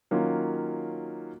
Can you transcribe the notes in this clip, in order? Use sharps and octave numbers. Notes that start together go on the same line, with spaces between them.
D#3 F#3 A#3 C#4 F4